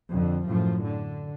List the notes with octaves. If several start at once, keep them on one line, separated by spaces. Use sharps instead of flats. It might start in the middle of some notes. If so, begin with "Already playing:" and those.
F2 D3
F#2 A2 F3
D3